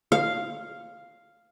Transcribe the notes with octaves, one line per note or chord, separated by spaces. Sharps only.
F5